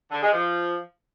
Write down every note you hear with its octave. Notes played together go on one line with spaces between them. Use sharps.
D3
G#3
F3